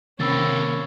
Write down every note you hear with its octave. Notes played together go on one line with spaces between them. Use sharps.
C3 D#3 A#3 C4 C#4 B5 E6 A6